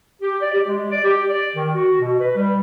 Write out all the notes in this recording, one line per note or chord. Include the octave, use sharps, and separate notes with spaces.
G4
D5
G4
G#3
D5
G4
D5
D#3
F#4
B2
B4
G3